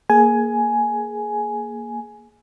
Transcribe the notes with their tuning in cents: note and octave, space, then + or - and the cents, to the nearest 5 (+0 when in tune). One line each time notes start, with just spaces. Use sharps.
A#3 +0 G#4 +15 G#5 +10